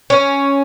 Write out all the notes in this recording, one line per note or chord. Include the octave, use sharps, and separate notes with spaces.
C#4